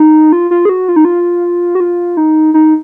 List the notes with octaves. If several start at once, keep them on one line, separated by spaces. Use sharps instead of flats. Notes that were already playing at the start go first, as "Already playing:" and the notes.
Already playing: D#4
F4
F4
G#4
F#4
F4
D#4
F4
F#4
F4
D#4
D#4